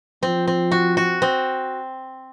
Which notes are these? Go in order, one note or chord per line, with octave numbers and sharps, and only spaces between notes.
F3 C4
C4
F#4
F#4
C4